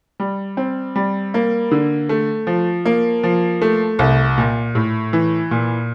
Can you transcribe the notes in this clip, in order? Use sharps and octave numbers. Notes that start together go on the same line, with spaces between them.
G3
C4
G3
A#3
D3
A3
F3
A#3
F3
A3
C2
A#2
A2
E3
A#2